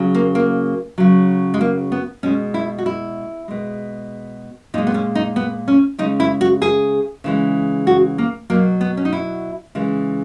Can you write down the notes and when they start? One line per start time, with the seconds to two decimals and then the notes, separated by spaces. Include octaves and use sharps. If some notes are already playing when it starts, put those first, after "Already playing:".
Already playing: C#3 F#3
0.15 A#3
0.35 A#3
0.98 C#3 F#3
1.54 G#3
1.61 A#3
1.92 B3
2.23 B2 G#3 C#4
2.54 E4
2.78 F#4
2.86 E4
3.48 B2 G#3
4.74 A#2 D#4
4.78 G#3
4.87 B3
4.94 C#4
5.15 D#4
5.36 B3
5.68 C#4
5.98 C#3 G#3 D#4
6.20 E4
6.41 F#4
6.62 G#4
7.24 C#3 E3 G#3
7.87 F#4
8.18 A#3
8.50 B2 F#3 A#3
8.81 B3
8.97 C#4
9.05 D#4
9.13 E4
9.75 C#3 E3 G#3